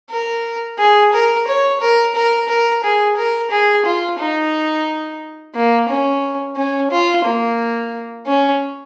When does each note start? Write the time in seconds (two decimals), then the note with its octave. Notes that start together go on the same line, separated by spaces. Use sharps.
0.10 A#4
0.79 G#4
1.13 A#4
1.47 C#5
1.81 A#4
2.15 A#4
2.49 A#4
2.83 G#4
3.17 A#4
3.51 G#4
3.85 F4
4.19 D#4
5.55 A#3
5.89 C#4
6.56 C#4
6.91 F4
7.25 A#3
8.26 C#4